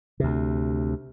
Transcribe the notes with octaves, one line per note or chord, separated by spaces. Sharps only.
D2 C3